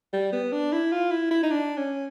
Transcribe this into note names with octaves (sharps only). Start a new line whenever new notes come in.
G3
B3
D4
E4
F4
E4
E4
D#4
D4
C#4